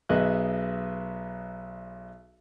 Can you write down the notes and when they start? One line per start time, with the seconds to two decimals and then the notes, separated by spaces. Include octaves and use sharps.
0.09 B1 B3 G#4 D#5 E5 F#6